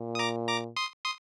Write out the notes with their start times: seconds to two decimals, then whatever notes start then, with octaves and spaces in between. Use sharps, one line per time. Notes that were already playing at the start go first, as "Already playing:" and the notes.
Already playing: A#2
0.15 D#6
0.19 A#5 D6
0.48 A#5 D6
0.76 C6 D#6
1.05 C6 D#6